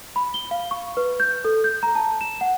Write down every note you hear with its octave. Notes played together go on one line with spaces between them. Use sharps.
B5
G7
F5
C#6
B4
G6
A4
G6
A#5
A5
E7
F#5